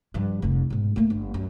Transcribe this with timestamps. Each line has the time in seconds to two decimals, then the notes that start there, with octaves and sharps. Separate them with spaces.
0.14 G2 F3
0.42 F1 C2
0.70 G#2 B2
0.96 A3 A#3
1.10 G1
1.34 F#2